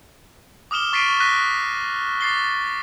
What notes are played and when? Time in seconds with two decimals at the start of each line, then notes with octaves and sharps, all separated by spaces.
0.71 D6 D#6 F6 E7 G7
0.93 C#6 A6 B6 C7 D7 D#7
1.20 F#6 A#6 B6 D#7
2.21 D6 A6 C7 G7